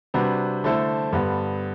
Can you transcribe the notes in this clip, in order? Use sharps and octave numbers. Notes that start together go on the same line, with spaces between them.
C3 G3 D4 F#4 B4
D3 A3 E4 A4 C5
G2 D3 G3 B3